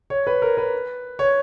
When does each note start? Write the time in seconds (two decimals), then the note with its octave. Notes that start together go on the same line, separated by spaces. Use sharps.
0.10 C#5
0.27 B4
0.42 A#4
0.57 B4
1.19 C#5